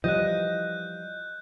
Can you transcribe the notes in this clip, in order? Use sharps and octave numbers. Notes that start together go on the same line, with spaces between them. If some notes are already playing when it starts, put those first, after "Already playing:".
E3 F3 G3 D#5 F#6 G6